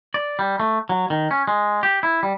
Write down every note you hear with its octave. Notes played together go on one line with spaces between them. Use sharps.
D5
G3
A3
F#3
D#3
C#4
G#3
G4
E4
G3